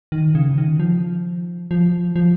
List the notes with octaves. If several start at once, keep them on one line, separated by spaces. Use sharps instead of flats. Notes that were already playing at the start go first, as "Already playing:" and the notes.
D#3
C#3
D#3
F3
F3
F3